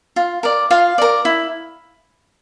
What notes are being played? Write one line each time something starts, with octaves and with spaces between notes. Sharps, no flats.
F4
A#4 D5
F4 F5
A#4 D5
E4